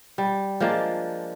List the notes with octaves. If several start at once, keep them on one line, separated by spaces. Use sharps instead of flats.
G3
F3 G#3 A#3 D4